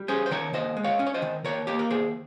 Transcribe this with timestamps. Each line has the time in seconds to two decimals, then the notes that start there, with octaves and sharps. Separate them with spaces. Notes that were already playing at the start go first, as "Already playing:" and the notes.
Already playing: G3
0.08 C#4 G#4 C5
0.26 C5
0.31 D#3 A#4 C#5
0.53 D#2 C5 D#5
0.77 G#3
0.84 C#5 F5
0.99 C#4
1.07 C#5
1.14 C5 D#5
1.22 D#3
1.44 D#2 A#4 C#5
1.67 A#3 G4 A#4
1.79 A#4
1.90 D#2 G#4 C5